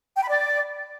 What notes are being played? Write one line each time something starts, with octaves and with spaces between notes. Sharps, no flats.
G5
B5
D5